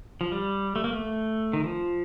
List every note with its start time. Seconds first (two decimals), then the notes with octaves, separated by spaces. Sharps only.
0.21 F3
0.32 G3
0.76 A3
0.84 A#3
0.93 A3
1.53 D#3
1.64 F3